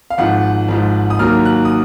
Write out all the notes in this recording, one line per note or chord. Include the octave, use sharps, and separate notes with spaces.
F5
G#1 G#2 F3 F#5
G#1 G#2 F3
D#6
D#2 D#3 F#3 A#3 F6
F#6
D#6